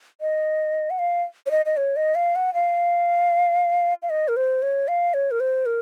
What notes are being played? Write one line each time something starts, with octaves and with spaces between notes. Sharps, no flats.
D#5
F#5
F5
C#5
D#5
D#5
C#5
D#5
F5
F#5
F5
F5
D#5
A#4
C5
C#5
F5
C#5
A#4
C5
A#4